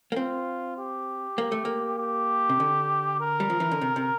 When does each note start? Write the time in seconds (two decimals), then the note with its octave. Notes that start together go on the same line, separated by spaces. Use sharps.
0.12 A#3
0.16 C4 F4
0.78 G4
1.38 A#3
1.52 A3
1.65 A#3
1.99 G4
2.49 C3
2.60 D3
3.20 A#4
3.40 G3
3.50 F3
3.60 E3
3.71 D3
3.81 C3
3.96 C3